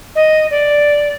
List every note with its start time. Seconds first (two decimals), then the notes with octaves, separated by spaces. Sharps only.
0.15 D#5
0.50 D5